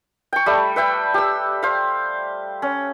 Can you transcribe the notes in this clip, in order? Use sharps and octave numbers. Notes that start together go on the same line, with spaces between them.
G5 C#6
G3 A3
B4 E5 G5
G4 E6
C5 F5
C#4